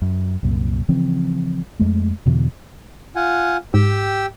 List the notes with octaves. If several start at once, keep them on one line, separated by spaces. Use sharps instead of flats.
F#2
C2 F#2 A#2
C#3 E3 F3 C4
F2 G#3 A3
E2 B2 D3 E3
F4 F#5 G#5
G#2 G4 G5 E6